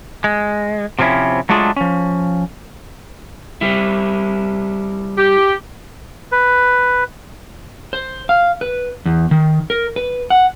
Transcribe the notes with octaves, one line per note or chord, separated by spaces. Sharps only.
G#3
C3 F3 C4 C#4 E4
F#3 G#3 A3 D4 F4 G#4
F3 C#4
G3 E4
G4
B4
C5
F5
B4
E2
D#3
A#4
B4
F#5